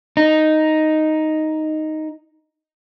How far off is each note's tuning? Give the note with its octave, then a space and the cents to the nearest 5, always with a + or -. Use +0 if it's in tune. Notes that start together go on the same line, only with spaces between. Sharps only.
D#4 +0